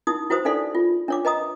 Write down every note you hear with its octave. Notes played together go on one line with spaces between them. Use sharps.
D#4 E4 D#6
E4 F#4 B4 C5 D#6
D4 D#4 A4 D5 F5 C6
F4
D4 C#5 D6
B4 D#5 A#5 D#6